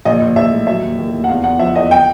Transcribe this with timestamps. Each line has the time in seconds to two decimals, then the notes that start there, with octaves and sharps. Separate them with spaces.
0.05 A#1 D#5
0.21 A#1
0.36 A#1 E5
0.51 A2
0.67 F#3 E5
0.82 D#2
0.98 D#2
1.14 D#2
1.24 F#5
1.28 E2 F5
1.44 E2 F#5
1.59 F3 E5
1.75 E2 D#5
1.91 G5